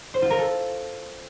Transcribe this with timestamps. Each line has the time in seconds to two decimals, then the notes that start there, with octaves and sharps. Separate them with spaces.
0.14 C5
0.22 F4
0.30 A#4
0.39 A4